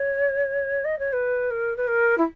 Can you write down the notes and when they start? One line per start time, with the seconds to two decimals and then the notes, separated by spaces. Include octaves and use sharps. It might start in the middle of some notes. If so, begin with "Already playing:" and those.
Already playing: C#5
0.85 D#5
0.99 C#5
1.13 B4
1.51 A#4
1.77 B4
1.88 A#4
2.18 E4